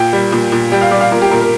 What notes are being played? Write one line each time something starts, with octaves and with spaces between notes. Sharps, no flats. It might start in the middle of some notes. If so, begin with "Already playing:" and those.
Already playing: A#2 G5
G3
A#2
A#2
G3 G5
F5
G3 D5
F5
A#2 A#4
G4
A#2 A#4
A#4